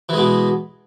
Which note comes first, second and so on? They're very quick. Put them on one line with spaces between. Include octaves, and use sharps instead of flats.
E3 G#3 B2